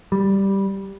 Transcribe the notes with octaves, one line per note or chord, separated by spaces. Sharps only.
G3